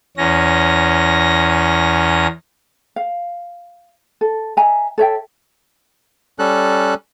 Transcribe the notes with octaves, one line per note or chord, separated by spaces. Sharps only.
E2 C#4 A#6
F5
A4
D#5 E5 G#5 A#5
A4 C#5 E5 G5
G3 C#4 A4 F#6